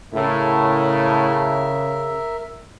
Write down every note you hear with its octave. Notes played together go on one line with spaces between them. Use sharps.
A2 C#3 A#4 E5